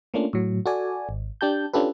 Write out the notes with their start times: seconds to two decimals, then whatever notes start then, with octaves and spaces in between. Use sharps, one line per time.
0.14 A3 A#3 C#4 D4 F4
0.33 A2 F#3
0.66 F#4 A4 D5 G#5
1.09 G#1
1.41 D4 G4 A5 G6
1.73 C#4 D4 F4 G4 A4 B4